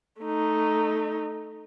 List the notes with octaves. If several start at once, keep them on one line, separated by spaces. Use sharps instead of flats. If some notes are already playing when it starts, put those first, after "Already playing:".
A3 D#4